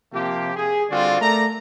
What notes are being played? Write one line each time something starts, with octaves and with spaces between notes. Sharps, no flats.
C3 F3 A#3 G4
G#4
D3 G3 C4 F4 F#4 D5
A3 A#4 D5 A#5